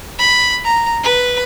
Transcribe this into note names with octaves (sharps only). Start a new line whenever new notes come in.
B5
A#5
B4